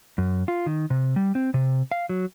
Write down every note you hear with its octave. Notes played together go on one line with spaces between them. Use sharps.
F#2
F4
D#3
C3
G3
C4
C3
F5
F#3